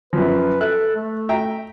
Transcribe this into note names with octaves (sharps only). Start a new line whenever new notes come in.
F#2 F3 B4
A4 E5 F#6
A3
E5 G5 A#5